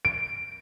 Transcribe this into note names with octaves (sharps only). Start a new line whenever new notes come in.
D7